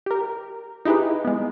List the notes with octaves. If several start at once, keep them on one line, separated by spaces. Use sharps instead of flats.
G4 A#4
D#4 E4 G4 G#4 B4
G#3 B3